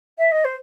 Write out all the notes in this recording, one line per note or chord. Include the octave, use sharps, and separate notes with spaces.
E5
D#5
C5